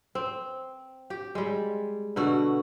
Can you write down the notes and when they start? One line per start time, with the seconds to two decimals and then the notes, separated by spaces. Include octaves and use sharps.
0.15 C4
1.10 G4
1.35 G3 G#3
2.16 B2 D3 A3 F#4